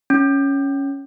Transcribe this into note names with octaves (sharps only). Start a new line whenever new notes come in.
C#4